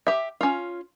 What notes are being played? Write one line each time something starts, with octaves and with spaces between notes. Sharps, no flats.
G4 E5
C#4 F4